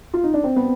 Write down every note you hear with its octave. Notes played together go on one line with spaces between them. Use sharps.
F4
D#4
D4
C4
B3